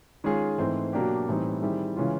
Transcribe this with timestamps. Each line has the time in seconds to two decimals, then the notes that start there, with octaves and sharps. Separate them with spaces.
0.24 D#3 G#3 C#4 F4 G#4
0.58 G#2 E3 A3 C4
0.93 B2 F#3 A#3 D4 G4
1.28 A2 E3 G3 C4 D#4
1.62 D#3 G3 C4 E4 G#4
1.97 C#3 E3 G#3 C#4 F4